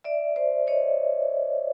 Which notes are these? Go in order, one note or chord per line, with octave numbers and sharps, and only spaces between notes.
D5 E5
C5 D5
C#5 D#5